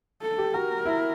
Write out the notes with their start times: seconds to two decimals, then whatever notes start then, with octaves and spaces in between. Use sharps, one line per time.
0.22 A4
0.38 G4
0.54 F#4 A#4
0.85 E4